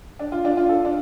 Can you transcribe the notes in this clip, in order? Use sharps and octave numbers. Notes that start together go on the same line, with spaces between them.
D4
F4
D4
F4
A4
D4